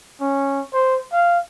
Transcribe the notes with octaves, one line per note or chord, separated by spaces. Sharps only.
C#4
C5
F5